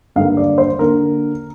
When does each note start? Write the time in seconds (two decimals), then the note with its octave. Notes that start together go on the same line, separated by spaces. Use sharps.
0.16 G2 D3 A#3 F5
0.37 D5
0.58 C5
0.79 D3 A#3 A#4